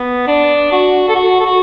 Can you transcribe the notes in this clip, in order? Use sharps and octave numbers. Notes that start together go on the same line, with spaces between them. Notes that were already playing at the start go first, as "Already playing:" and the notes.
Already playing: B3
D4
F#4
A4
F#4
A4
F#4